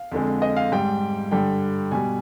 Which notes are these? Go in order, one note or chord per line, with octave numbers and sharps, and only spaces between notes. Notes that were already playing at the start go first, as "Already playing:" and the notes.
Already playing: F5
F2 D3 G#3
D#5
F5
G#2 G3 G5
G2 D3 G3 G5
B2 G3 G#5